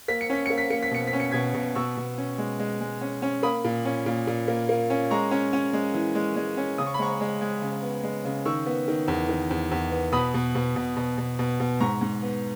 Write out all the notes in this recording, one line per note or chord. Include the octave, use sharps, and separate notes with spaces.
A#3 B6
C#7
C#4 B6
A#3 C#7
B6
A#3 C#7
B6
B2 C#7
B6
C#4
C#7
B2 G#6 B6
B2
B2 C#6 E6
B2
C#4
G#3
G#3
G#3
C#4
C#4
A#3 B5 D#6
A#2
C#4
A#2
A#2
A#3
A#3
C#4
G#3 A#5 C#6
C#4
C#4
G#3
E3
G#3
G#3
C#4
C#3 D#6
C#6
B5
G#3 A#5 C#6
G#3
G#3
C#3
B3
G#3
C#3
D#3 C#6 E6
B3
D#3
E2
D#3
E2
E2
B3
B2 B5 D#6
B2
B2
B2
B2
B2
B2
B2
G#2 A#5 C#6
G#2
B3